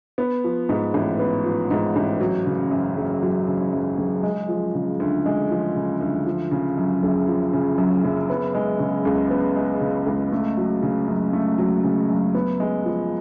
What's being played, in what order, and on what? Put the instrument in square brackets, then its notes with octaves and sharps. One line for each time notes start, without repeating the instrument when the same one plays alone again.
[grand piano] B3
F3
G#2
A1
B3
F3
G#2
A1
F#3
C#3
F#2
F#1
F#3
C#3
F#2
F#1
G#3
F3
C#3
D2
G#3
F3
C#3
D2
F3
C#3
F#2
F#1
F3
C#3
F#2
F#1
B3
G#3
C#3
C#2
B3
G#3
C#3
C#2
A3
F#3
C#3
F#2
A3
F#3
C#3
F#2
B3
G#3
F3